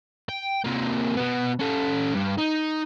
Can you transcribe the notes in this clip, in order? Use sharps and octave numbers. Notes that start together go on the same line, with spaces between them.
G5
C3 A#3
B2 B3
C#4 A4
G2
D#4